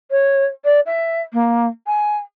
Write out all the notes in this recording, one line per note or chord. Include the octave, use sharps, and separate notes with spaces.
C#5
D5
E5
A#3
G#5